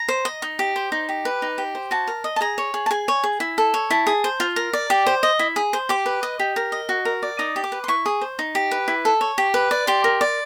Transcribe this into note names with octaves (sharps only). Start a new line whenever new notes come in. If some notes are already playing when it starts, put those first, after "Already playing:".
Already playing: A#5
C5
D#5
D#4
G4
C5
D#4
G4
B4
D#4
G4
C5
F#4 A5
A#4
D#5
A5
G#4 A#5
C#5
G#4
A5
G#4 G#5
C#5
G#4
E4
A4
C#5
E4 A5
G#4
C5
F4
A#4
D5
G4
C5
D#5
E4
G#4
C5
G4 D6
B4
D#5
G4
A#4
D#5
F#4
A#4
D5
D#4 D#6
G4
D6
B4
C6
E4 C#6
G#4
C5
D#4
G4
B4
E4
A4
C#5
G4
B4
D5
G4 C6
A#4
D5